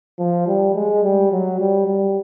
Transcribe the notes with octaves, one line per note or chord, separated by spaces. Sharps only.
F3
G3
G#3
G3
F#3
G3
G3